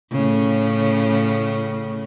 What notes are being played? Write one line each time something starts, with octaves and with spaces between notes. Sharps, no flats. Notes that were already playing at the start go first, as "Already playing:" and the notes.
A2 C#3